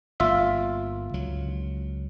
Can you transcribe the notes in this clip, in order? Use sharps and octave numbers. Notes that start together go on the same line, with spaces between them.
G1 A#3 F4 E5
C#2 F#3